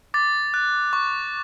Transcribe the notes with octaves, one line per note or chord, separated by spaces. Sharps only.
D6 A6
F#6
C#6